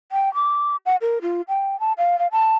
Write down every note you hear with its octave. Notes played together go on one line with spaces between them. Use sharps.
G5
D6
F#5
A#4
F4
G5
A5
F5
F5
A5